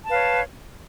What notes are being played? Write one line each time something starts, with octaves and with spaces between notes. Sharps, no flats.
B4 C#5 F5 A5